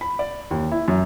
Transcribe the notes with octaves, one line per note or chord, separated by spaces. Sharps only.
B5
D5
D#2
E4
F#2